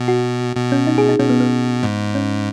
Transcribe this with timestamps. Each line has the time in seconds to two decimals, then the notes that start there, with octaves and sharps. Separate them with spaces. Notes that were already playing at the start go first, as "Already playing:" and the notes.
Already playing: B2
0.08 F#4
0.56 B2
0.72 C#4
0.87 D#4
0.98 G#4
1.09 D#4
1.19 B2 C#4
1.30 B3
1.40 B3
1.83 G#2
2.15 C#4